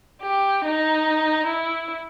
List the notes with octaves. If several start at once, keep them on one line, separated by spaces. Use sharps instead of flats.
G4
D#4
E4